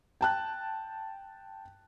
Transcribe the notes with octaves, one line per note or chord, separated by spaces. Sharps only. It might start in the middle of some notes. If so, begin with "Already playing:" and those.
G5 A5 F#6